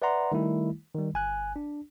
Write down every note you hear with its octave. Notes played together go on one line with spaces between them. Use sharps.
B4 D5 E5 F#5 A#5 C6
D#3 G3 A3 E4
D#3 G3
G1 G#5 F#6
D4